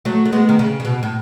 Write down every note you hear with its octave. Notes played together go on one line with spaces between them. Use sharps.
F#3 A3
A3
G#3 B3
D#3
C#3
C#3
B2
A2